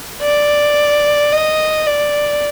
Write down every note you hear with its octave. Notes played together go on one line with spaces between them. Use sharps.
D5
D#5
D5